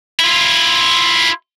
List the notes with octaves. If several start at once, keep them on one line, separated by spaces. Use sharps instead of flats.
E4 F4